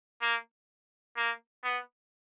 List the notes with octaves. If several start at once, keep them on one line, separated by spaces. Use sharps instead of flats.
A#3
A#3
B3